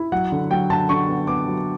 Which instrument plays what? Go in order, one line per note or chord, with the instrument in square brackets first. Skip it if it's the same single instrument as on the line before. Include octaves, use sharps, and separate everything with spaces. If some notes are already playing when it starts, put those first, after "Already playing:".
Already playing: [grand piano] E4
F#3 F#5
D3
F#3 G5
D3 A5
D3 C#6
B3
B3 D6
F#3